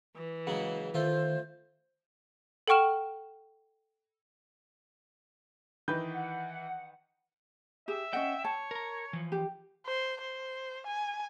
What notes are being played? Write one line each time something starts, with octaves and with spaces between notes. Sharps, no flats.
E3
C#3 F#3 G#3 F#5
D#3 A3 F4 C5 E5
A4 F#5 G5 C#6 F6 E7
D#3 E3 B4 D#5 G6
F#5
G4 G#4 E5
C#4 D#5 F#5 G5
C#5 A5
A#4 A#5
E3 F3
G4
C5
C5
G#5